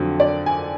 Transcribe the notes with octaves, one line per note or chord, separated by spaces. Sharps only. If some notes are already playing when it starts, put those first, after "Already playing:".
Already playing: F2 D3 F#3
D5
G#5